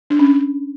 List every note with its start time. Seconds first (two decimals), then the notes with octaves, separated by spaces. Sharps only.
0.10 D4
0.19 C#4